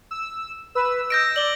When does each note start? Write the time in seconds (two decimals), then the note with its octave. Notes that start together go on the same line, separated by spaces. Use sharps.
0.11 E6
0.75 B4 E6
1.10 D#5 G6 A#6 D7
1.36 D5 F#7 G7